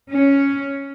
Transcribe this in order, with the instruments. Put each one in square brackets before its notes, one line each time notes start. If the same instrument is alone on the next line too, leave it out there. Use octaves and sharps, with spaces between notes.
[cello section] C#4